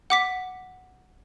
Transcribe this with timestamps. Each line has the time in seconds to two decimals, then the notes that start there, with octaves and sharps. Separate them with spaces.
0.10 F#5 D6 B6